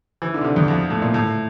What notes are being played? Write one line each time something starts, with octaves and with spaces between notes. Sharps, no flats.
E3
D3
C3
D3
E2
F2
A2
A#2
A2